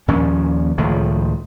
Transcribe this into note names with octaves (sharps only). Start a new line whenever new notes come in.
D#2 A#2 F3 C#4
C#2 A2 D#3 F3